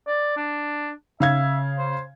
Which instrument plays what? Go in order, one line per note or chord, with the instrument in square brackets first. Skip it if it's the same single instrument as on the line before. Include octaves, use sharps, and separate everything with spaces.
[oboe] D5
D4
[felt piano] C#3 F5 G#6 [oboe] E5
[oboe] C5